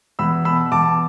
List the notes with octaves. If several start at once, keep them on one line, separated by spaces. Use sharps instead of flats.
E2 B5 E6
B2 B5 E6
E2 A5 D6